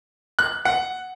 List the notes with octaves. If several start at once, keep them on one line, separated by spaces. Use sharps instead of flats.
F#6
F#5